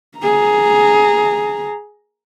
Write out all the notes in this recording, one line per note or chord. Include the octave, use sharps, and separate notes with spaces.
G#4 A#5